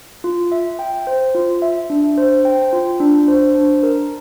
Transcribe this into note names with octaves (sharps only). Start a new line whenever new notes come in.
F4
E5
G5
C5
F4
E5
D4
C5
G5
F4
D4
C5
D4
A#4